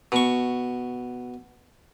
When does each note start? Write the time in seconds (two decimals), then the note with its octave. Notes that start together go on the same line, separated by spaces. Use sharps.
0.12 B2 C#6